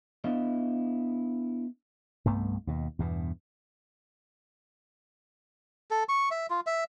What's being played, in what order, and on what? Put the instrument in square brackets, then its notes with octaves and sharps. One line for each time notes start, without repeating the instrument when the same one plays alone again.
[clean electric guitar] B3 D4 E4 D#5 F5
[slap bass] C2 G2 A3 B3
D#2 B2
E2 G2 B2
[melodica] A4
C#6
E5
F4
E5